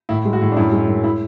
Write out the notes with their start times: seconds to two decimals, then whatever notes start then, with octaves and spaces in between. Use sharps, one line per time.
0.09 A2 E4
0.25 G#3
0.33 F#4
0.41 A2
0.52 D4
0.57 F#2 E4
0.72 G#3
0.88 F#2
1.04 E4